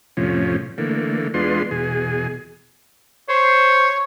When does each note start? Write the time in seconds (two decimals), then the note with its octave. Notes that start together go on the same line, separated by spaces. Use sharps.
0.17 F2 A2 C3 F3 C#4
0.78 D3 E3 A3 A#3
1.34 E2 G#3 B3 D4 F4 C6
1.71 E2 B2 G#4
3.29 C5 C#5